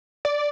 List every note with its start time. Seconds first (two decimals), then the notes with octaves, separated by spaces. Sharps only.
0.25 D5